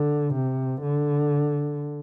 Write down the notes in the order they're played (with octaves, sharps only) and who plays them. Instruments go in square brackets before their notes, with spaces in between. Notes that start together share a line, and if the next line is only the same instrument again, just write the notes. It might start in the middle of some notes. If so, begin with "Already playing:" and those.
Already playing: [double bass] D3
C3
D3